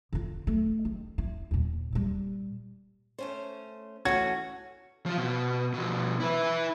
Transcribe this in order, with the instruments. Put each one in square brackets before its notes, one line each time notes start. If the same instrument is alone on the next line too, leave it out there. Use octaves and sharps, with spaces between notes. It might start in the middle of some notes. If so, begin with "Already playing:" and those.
[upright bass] D3 F4
A3
D#3
E4
D#2 A#2
A#2 G3
[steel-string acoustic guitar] A3 C#4 C5
[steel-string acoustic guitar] E3 A3 C#4 [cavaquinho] F#4 [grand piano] G#6
[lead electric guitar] F3 F4
B2
B2 F3
E4 B4